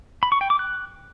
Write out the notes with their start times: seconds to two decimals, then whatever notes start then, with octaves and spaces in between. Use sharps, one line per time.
0.23 B5
0.32 C#6
0.41 G5
0.50 D6
0.59 F#6